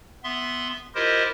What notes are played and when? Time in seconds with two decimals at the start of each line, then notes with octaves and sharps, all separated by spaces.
0.24 B3 E5 C6
0.95 E4 F4 G4 A#4 C5 D#5